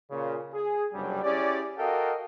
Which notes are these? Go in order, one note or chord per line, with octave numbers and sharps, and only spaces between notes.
A#2 C#3
G#4
F#1 G2 C3 F#3 G3
C#4 E4 G4 G#4 D5
F#4 A4 A#4 D#5 F5 G5